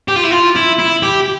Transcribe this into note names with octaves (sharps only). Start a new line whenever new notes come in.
G4
F4
E4
F4
E4
E4
G4